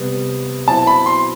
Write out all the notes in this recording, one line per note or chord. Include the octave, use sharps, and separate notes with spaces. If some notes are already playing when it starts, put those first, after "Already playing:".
Already playing: C3 G3 B3
B2 F#3 C4 E4 A5
B5
C6